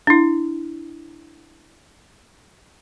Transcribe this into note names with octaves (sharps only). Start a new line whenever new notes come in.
D4 E4